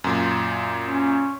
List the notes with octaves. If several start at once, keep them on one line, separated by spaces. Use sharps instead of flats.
F#2 A#2
C#4